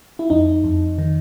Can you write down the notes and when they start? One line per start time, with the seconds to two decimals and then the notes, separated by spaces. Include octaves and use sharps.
0.19 E4
0.30 F2 D#4
0.64 F2
0.98 D#3